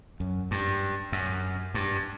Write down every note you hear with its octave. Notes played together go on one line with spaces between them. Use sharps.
F#2
G2
F#2
G2